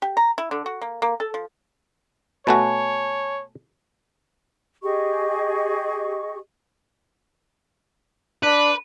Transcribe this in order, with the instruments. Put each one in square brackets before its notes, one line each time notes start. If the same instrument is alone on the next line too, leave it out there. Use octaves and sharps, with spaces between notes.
[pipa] G4
A#5
E4
D3
F#4
A#3
A#3
A4
F3
[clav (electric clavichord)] B2 A3 F#4 [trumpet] C#5 [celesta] G#5 A5 B5
[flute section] G4 G#4 D#5 C#6
[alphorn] D4 [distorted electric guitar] B4